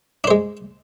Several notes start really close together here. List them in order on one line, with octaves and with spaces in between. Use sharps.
D4 C5 G#3